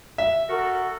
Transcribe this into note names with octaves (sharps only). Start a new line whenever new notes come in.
E5
F#4 A4 A#4